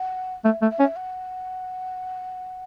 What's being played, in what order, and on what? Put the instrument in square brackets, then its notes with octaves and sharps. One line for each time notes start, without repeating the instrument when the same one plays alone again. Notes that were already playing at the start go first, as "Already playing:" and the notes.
Already playing: [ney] F#5
[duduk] A3 [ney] E5
[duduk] A3
[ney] E5
[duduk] C#4
[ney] E5
F#5